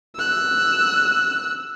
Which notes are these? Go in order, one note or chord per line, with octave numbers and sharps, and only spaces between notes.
E6 F#6